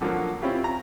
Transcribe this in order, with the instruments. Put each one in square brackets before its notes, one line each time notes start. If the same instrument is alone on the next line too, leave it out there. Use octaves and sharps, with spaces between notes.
[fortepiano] F#2 D3 F3 F#3 A#3
C4 C#4 E4 F4 G4
A#5